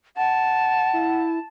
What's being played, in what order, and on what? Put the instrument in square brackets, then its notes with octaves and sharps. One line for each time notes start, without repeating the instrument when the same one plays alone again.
[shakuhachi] F#5 [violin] A5
[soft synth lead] E4